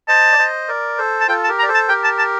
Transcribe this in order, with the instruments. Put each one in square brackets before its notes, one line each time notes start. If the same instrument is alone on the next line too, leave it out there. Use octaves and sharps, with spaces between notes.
[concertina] C5 D#5 [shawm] A5
[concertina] D5
C5 D#5
A#4 D5
A4 C5
[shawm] A5
[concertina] F4 A4 [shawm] G5
[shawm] A5
[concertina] G4 A#4
[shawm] A#5
[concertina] D5
A4 C5
[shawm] A5
[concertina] G4 A#4 [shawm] G5
[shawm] A5
A5